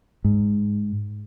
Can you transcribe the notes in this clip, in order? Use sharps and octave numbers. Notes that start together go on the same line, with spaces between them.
G#2